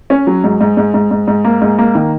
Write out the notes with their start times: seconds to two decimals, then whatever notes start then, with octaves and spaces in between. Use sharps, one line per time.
0.10 C#4
0.27 F#3
0.44 G#2
0.60 G#2
0.77 G#2
0.94 G#2
1.11 G#2
1.27 G#2
1.44 A#3
1.62 G#2
1.78 A#3
1.95 D#3